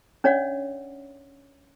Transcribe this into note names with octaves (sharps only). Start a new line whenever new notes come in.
C#4 D4 C#5 D5 E5 F#5